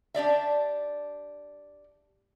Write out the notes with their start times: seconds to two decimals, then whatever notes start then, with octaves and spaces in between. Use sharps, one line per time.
0.14 D4 G4 D5 E5